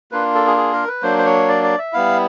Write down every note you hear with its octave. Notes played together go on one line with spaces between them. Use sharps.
A#3 D4 F4 B4
A4
G#4
G#4
A#4
B4
F#3 A#3 D4 C5
C5
C#5
D5
D5
E5
G3 B3 E4 F5